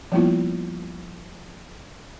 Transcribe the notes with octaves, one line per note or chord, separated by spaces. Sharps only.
F3 G3 A#3 B3 E4 F4